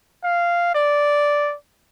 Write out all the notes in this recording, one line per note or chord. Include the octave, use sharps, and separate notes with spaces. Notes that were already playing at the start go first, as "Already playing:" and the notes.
F5
D5